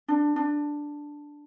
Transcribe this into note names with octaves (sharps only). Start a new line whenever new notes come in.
D4
D4